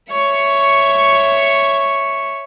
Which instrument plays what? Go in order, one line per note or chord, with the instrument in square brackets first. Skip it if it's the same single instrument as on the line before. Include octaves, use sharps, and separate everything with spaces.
[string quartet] C#5 E5 C#6